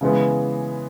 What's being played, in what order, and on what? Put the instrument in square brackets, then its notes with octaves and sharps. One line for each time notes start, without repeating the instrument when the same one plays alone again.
[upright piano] C#3 E3 G#3 B3